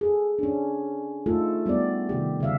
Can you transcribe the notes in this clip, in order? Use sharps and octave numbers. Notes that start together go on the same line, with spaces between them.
G#4 A4
C#4 D4
A3 D#4 F4 A4
G3 B3 F4 D5
C3 D#3 G4
C#3 G3 E5 F5